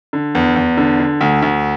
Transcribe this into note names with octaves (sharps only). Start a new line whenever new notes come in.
D3
E2
E2
D3
D3
D2
D2